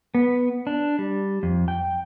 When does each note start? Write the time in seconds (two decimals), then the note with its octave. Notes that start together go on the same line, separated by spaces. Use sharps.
0.15 B3
0.67 D4
0.99 G3
1.43 F2
1.68 G5